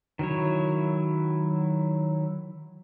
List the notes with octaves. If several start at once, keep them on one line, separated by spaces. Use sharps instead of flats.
D#3 F#3 E4 C#5